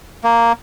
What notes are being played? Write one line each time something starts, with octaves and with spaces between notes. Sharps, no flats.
A#3